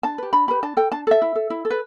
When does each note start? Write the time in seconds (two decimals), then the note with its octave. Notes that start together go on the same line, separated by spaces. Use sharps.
0.03 D4 A5
0.18 G4 B4
0.33 D4 B5
0.48 G4 B4 B5
0.63 D4 A5
0.77 A4 G5
0.92 D4 A5
1.07 A4 E5
1.22 E4
1.35 A4
1.50 E4
1.65 A4
1.70 B4